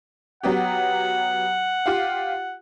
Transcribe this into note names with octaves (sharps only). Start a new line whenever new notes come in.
F#3 B3 G4 F#5
F4 G4 F5